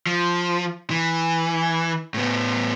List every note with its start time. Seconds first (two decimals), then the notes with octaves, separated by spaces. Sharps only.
0.07 F3
0.90 E3
2.14 A2 B3